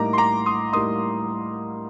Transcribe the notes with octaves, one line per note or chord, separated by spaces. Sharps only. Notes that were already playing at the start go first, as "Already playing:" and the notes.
Already playing: A2 G3 A#3 D#4 A#5 D6
C6
A#5 D6
C6 D#6
A2 G3 A#3 D#4 C6 D#6